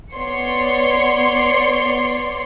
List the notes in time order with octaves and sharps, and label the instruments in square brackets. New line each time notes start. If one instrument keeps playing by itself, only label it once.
[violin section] B3 C#5 D5 C6 C#7